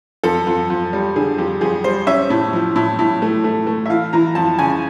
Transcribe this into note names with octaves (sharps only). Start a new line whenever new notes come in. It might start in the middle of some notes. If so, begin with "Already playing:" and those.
F2 A4
F2
F2
G3
D3 G#4
F2 G4
F2 G#4
G3 C5
C#4 E5
A2
F3
A2
A2
A3
A3
A3
E5
E3 F5
E3 A#5
F2 A5
C#3 G#5